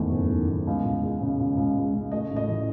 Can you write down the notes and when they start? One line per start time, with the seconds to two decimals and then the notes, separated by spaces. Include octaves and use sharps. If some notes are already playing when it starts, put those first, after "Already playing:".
Already playing: F#1 E2 D#3 A3
0.12 F#1
0.30 D#3
0.48 E2
0.67 C#2
0.85 C#2
1.03 G#3
1.21 C#3
1.39 C#2
1.57 C#2
1.76 G#3
1.93 C#3
2.11 A3 D#5
2.30 A1
2.36 D#5
2.48 E3